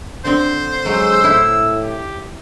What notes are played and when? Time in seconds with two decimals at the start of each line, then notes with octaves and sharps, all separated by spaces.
0.25 D3 C4 C5
0.86 F#3 G#3 E6
1.24 A2 E4
1.83 G4